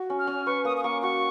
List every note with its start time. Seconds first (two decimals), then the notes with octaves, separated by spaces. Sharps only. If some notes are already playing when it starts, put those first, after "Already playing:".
Already playing: F#4
0.10 C#4
0.19 F6
0.27 C#4
0.46 B4 C#6
0.65 A#3 D#6
0.77 D#6
0.83 A#3 C#6
1.02 F#4 C#6